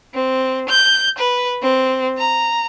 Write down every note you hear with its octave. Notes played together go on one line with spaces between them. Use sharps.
C4
G6
B4
C4
A#5